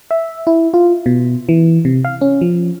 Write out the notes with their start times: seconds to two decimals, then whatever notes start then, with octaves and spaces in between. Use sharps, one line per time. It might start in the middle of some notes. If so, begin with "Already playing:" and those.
0.11 E5
0.47 E4
0.74 F4
1.06 B2
1.49 E3
1.85 C3
2.05 F5
2.21 C#4
2.41 F3